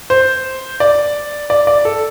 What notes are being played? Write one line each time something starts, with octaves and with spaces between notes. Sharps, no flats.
C5
D5
D5
D5
A4